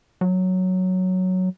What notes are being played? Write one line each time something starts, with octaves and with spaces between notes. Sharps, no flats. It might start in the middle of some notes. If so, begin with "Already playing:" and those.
F#3